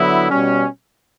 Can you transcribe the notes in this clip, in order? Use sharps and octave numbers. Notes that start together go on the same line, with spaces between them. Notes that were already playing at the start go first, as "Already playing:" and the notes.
Already playing: D3 F#3 B3 E4
B2 G3 C#4